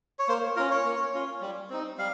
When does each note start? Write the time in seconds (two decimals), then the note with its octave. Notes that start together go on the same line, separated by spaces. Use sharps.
0.19 C#5
0.28 A#3 C5
0.56 F4 A#4
0.59 C#4
0.71 C#5
0.85 A#3
1.14 C#4 F4
1.41 G3
1.70 C4 D#4
1.98 G3 F5